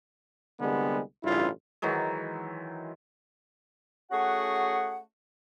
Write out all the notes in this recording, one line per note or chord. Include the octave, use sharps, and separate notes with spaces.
C2 D3 G3 G#3 B3
A1 G2 C#3 E4 F4
D#3 E3 F#3 G#3
A3 C#4 F#4 G#4 F#5